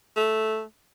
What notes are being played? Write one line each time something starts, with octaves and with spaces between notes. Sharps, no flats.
A3